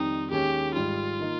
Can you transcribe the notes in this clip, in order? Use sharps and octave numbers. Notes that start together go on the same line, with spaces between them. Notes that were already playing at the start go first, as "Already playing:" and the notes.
Already playing: F2 D#3 G3 C4 D#4
D#2 D#3 G#3 C#4 G4
G#1 G#2 G3 F4
D#3 A#3 D#4